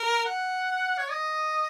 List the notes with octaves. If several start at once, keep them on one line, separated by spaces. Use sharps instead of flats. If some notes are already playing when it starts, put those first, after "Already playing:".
Already playing: A#4
F#5
C#5
D#5